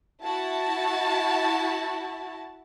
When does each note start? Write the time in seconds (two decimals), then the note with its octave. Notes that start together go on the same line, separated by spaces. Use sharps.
0.24 E4 F#4 A5